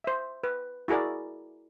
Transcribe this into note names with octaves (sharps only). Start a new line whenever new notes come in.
C5 E5
B4
E4 F#4 G#4 A#4 D5